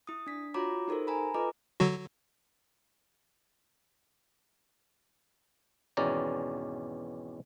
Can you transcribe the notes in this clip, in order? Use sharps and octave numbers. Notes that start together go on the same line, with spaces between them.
E4 D#6
D4 B6
F4 F#4 C#5 A#5 B5 D6
D#4 G4 A4 A#4 C5
G#5 A#5 B5
F4 A4 B4 D#5 A#5 D6
D3 F#3 F#4
G#1 E2 B2 C#4 D5 A#5